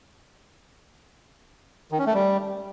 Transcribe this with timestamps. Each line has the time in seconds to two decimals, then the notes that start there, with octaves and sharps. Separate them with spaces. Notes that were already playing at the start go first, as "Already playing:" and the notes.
1.92 D#3
1.99 C#4
2.06 A3
2.14 G3